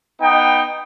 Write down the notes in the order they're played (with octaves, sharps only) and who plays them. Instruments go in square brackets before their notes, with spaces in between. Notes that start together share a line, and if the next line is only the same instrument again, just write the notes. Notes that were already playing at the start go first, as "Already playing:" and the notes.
[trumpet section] B3 D#4 D#5 G5